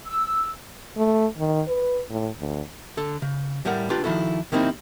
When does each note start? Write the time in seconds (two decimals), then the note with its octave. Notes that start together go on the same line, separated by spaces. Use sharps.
0.06 E6
0.97 A3
1.38 D#3
1.68 B4
2.10 A2
2.39 D2
2.97 D3 A4
3.22 C#3
3.65 A2 G3 A3 A#4 F#5
3.90 C#2 D4 F4 G4 B4
4.04 D#3 F3 E4 F#4 A4
4.52 C3 D#3 A#3 C4 D#4 E4